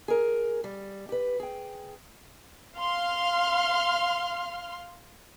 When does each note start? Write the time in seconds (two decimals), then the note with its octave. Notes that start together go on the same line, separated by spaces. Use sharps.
0.08 G#4 A#4
0.64 G3
1.09 G4 B4
1.40 G#4 G5
2.77 F5 C6 F6